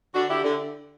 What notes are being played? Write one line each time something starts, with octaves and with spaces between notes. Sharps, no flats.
D3 D4 F#4
D3 E4 G4
D3